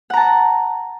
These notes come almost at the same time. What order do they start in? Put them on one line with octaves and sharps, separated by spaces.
F#5 A#5 A5